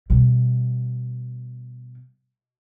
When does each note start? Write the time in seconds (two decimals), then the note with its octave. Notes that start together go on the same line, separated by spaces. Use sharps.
0.10 B2 G3